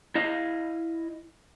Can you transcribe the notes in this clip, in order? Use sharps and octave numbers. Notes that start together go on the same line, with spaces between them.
E4 D#5 F5